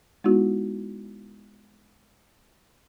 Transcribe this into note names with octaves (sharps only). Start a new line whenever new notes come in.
G#3 B3 D#4 E4 F#4